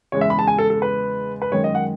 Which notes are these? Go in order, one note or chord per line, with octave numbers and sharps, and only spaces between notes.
E2 C#3 G#3 C#5
E5
B5
A5
G#5
A4
A4
B4
B4
F#2 D#3 G#3 C#5
D#5
F#5